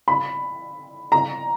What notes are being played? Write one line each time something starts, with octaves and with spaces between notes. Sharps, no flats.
B5
A#5